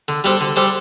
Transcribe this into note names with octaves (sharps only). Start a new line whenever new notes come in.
D3
G3 D4 A4 C5
D3
G3 D4 A4 C5